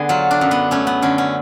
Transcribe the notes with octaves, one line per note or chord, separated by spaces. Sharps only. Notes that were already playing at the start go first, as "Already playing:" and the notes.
Already playing: D3 B3 G#4
F#3 F4
D4
F#2
B3
A3 C#4
B3
D3 C#4
C#4